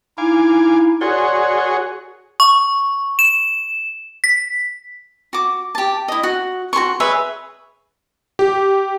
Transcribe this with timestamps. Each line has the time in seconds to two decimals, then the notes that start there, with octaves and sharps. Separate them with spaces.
0.18 D#4 E4 F5 G#5 D6
1.01 F#4 G#4 A#4 C#5 D5 C6
2.40 C#6
3.19 E7
4.24 B6
5.33 F#4 D6
5.75 G4 A5
6.08 E4 D#5
6.23 F#4
6.73 F#4 G#4 C6 C#6
7.00 G#4 B4 C#5 E5
8.39 G4